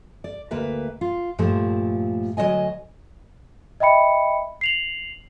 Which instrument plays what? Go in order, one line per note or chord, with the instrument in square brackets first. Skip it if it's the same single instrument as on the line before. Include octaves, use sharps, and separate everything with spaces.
[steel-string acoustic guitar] D5
D2 A#3 B4 E5
F4
G2 A#2 F3 A3
D2 F#3 G#3 C#5 D#5 G#5
[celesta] D#5 E5 G5 B5 C#7
C7 F7 F#7